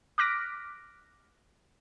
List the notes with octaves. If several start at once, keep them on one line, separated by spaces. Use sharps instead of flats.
D6 F6 F#6 A#6 B6 D7